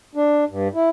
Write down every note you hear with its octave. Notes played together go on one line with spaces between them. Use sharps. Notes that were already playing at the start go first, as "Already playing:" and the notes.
D4
G2
E4